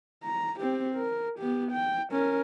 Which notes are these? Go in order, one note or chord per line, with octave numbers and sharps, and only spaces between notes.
A#5
C4 G4
A#4
B3 G4
G5
C#4 A#4